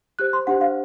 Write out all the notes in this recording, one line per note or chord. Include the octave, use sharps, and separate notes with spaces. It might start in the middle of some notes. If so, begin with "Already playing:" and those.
G4 C5 F#6
C6
D4 G4 C5 F#5
F5